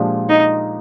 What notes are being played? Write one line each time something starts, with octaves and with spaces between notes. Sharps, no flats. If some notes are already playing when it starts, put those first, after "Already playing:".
Already playing: A#2 F3 G#3 D4 G4
D#4